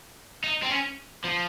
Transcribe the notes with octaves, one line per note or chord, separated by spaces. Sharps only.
D#4
C4
C#4
F3